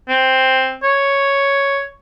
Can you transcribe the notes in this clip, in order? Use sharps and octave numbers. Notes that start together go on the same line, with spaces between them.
C4
C#5